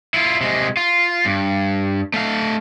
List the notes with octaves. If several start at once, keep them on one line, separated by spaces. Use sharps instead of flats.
E4 F4
C3 G#3
F4
G2
A3 F5